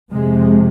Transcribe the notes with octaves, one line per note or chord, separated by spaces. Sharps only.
F2 C3 G#3